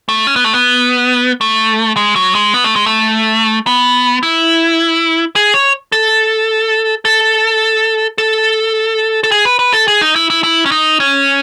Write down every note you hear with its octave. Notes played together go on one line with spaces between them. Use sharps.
A3
C#4
B3
A3
B3
A3
G#3
F#3
G#3
B3
A3
G#3
A3
B3
E4
G#4
C#5
A4
A4
A4
A4
G#4
B4
B4
A4
G#4
D#4
E4
E4
E4
C#4
D#4
C#4